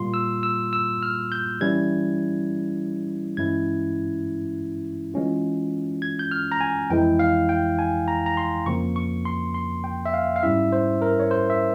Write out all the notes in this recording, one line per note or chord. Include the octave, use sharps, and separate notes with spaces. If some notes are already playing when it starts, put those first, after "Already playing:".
Already playing: A#2 G3 A#3 F4 C6
E6
E6
E6
F6
G6
E3 G3 C#4 E4 G#6
G2 E3 G#3 C#4 E4 G#6
E3 G#3 C#4 F4
G#6
G6
F6
A#5
G#5
F2 E3 G#3 E4 G5
F5
G5
G#5
A#5
A#5
C6
F2 C#3 F3 A#3 C#6
C#6
C6
C6
G5
E5
F5
F5
G#2 G3 C#4 E4 E5
C5
A#4
C#5
C5
E5